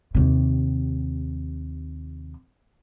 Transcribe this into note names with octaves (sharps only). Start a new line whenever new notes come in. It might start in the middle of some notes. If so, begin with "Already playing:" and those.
D#2 C3